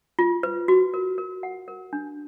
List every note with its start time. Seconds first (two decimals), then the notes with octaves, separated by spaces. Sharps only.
0.19 F4
0.43 B4
0.68 F#4
0.94 A#4
1.18 A#4
1.43 F#5
1.68 A#4
1.93 D4